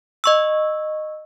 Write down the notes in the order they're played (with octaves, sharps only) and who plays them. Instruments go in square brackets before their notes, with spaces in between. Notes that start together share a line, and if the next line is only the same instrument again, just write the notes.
[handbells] D#5 C#6 E6